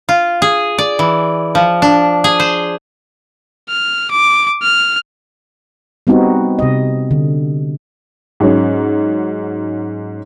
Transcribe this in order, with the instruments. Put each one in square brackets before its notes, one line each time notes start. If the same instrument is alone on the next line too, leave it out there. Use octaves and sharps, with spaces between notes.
[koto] F4
G#4
D5
E3
F3
D4
G#4
C5
[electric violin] F6
D6
F6
[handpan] G3 B3 C4 D#4 F#4
C3 D#5
D3
[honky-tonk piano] G#2 F#3 C#4